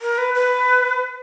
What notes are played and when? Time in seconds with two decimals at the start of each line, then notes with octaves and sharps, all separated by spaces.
0.02 A#4
0.18 B4
0.34 B4